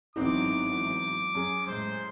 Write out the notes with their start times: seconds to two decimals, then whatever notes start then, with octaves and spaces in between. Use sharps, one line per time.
0.16 G#1 E3 F#3 B3 C4 D#4 D6
1.35 F#2 G#4
1.67 A2 G#3 C5